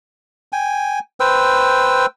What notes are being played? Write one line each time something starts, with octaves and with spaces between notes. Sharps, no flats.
G5 G#5
B4 C5 G5 E6